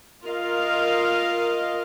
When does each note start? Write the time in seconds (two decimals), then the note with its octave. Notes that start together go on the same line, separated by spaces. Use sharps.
0.24 F4 A#4 D#5 F5